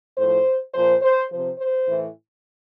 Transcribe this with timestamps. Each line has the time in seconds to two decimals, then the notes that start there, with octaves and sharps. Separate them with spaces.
0.18 A2 F3 C5
0.74 A#2 F3 C5
1.02 C5
1.30 C3 F3 C5
1.58 C5
1.86 A2 E3